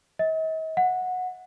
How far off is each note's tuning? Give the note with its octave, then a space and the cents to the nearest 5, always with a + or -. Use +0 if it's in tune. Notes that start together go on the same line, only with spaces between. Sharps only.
D#5 +45
F#5 -15